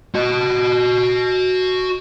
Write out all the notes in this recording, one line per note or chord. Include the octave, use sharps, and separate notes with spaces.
F#4 D#5